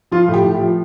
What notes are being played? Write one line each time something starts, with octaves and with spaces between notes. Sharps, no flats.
F3 F4
A2
G4
A2
G4
F3